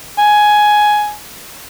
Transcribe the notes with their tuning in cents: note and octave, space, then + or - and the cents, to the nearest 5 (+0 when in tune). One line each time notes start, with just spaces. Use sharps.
G#5 +10